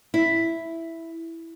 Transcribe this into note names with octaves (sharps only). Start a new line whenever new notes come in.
E4